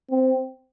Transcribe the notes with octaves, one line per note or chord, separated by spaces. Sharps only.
C4